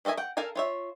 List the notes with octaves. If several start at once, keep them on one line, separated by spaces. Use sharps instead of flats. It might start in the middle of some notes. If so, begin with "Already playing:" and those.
D#3 A4 D#5 E5 G#5
F#5 G5
A4 A#4 F5 G#5
F4 C#5 E5